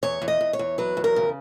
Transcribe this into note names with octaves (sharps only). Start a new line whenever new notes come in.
E2 C#5
E2
D#5
E2
C#5
E2
F#3 B4
E2
A#4
C#3